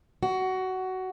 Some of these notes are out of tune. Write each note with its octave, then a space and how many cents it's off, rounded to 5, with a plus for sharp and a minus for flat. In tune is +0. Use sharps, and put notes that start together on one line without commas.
F#4 +15